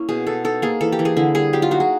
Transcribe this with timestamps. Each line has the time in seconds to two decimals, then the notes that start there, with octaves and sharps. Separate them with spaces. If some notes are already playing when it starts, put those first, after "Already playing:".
Already playing: A#3 C#4 E4
0.09 B2 G#4
0.27 B2 A4
0.44 D#4 A4
0.62 A#3 G#4
0.81 E3 A4
0.92 G4
0.99 E3
1.05 G#4
1.17 D3 E4
1.35 G3 G#4
1.53 F#3 G4
1.62 F4
1.71 D#4 F#4
1.80 G#4